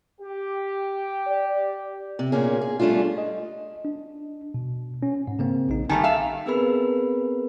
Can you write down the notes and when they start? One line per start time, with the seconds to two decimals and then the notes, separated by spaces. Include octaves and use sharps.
0.20 G4
1.27 D5
2.19 C3
2.32 A#2 A#3 C#4 G#4
2.61 G#4
2.80 G3 A3 C#4 D4 F4
3.18 D#5
3.85 D4
4.54 B2
5.03 C#4
5.28 G#2
5.39 C#3 A#3 C4
5.69 A#1 D#4
5.90 D#3 G3 A3 G#5 A5
6.04 E5 F5
6.46 B3 C4 G#4 A#4 B4 B5